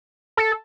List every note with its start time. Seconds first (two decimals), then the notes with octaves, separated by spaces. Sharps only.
0.37 A4